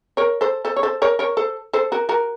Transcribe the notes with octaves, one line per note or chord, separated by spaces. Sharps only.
A#4 C#5
A4 C5
A4 C5
C#5
A4 C5
A#4 C#5
A#4 C#5
A4 C5
A4 C5
F#4 A#4
F#4 A#4